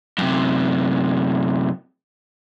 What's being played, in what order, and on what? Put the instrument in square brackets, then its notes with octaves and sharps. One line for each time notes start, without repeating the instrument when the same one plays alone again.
[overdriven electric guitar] F#2 C3